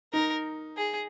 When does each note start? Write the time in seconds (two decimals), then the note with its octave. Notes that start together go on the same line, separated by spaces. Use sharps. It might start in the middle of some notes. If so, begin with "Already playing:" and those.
0.13 D#4 A#4
0.77 G#4